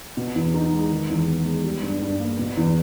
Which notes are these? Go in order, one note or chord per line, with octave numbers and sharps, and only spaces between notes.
B2
E2
D#4
G#3
D#3
E2
B3
G#3
G3
G2
G2
A#3
B2
E2